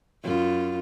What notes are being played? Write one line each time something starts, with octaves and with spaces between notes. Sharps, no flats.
F#2 F4